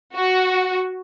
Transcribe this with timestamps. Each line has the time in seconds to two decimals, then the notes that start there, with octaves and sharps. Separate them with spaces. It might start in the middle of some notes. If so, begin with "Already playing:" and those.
0.14 F#4